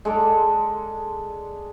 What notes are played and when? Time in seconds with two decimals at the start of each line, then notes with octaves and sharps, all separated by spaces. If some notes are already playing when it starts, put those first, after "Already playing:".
0.05 G#3 A4 D5